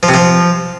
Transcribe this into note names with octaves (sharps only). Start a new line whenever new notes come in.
F3
C3
F3